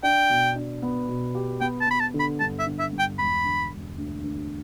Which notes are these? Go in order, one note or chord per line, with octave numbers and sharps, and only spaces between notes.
D4 G5
B2
D4
B3
B2
G4
B3 G5
A5
B3 B5
A5
D3
B5
G2 A5
E5
D3
E5
G2
G5
E1 B5
D3
E1
D2
D2